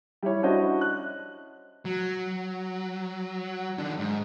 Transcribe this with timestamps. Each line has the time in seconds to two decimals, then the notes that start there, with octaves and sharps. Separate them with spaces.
0.23 G3 E4 C#5
0.43 C#4 D4 E4 F#4 C5 D#5
0.81 F#6
1.85 F#3
3.78 D#3 D4
3.99 G#2